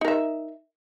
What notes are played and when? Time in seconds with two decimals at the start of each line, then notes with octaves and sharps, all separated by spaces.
0.01 D#4
0.05 A#4
0.08 E5